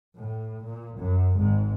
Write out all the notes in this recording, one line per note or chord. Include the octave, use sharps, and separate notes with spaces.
A2
A#2
F#2
G#1 G#2